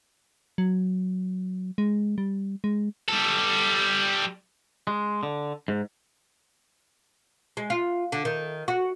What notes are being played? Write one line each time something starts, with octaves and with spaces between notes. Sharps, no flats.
F#3
G#3
G3
G#3
G3 A4
G#3
D3
G#2
G#3
F4
D3
D#3
F#4